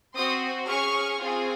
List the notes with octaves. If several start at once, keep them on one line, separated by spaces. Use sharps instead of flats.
C4 F#4 C6 D#6
C#4 G#4 C#6 F6
C4 F4 G#4